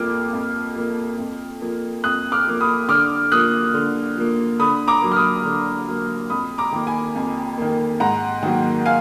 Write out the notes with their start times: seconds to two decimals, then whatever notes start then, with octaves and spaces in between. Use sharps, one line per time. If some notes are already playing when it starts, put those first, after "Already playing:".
Already playing: F2 F3 A#3 D6 F6
0.33 F2
0.76 F3 A#3
1.18 F2
1.61 F3 A#3
2.04 F2 D#6 F#6
2.32 D6 F6
2.47 F3 A#3
2.60 B5 D#6
2.89 D3 D6 F6
3.32 F3 A#3 D#6 F#6
3.74 D3
4.17 F3 A#3
4.59 D3 B5 D#6
4.88 A#5 D6
5.02 F#3 A#3
5.12 F6
5.16 B5 D#6
5.45 D3
5.87 F#3 A#3
6.30 F2 B5 D#6
6.58 A#5 D6
6.72 D#3 A#3
6.87 G#5 B5
7.15 F2
7.58 D#3 A#3
8.00 G#2 F#5 A#5
8.43 D#3 F#3 A#3
8.85 F5 G#5